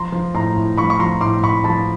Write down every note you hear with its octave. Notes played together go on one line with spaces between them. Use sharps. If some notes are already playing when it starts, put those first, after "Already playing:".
Already playing: F3 A#5 C6
F3
A2 A#5 C6
A2
F3 B5 C#6
C#6
F3 A#5 C6
A2 C6 D6
A2 B5 C#6
F3 A5 B5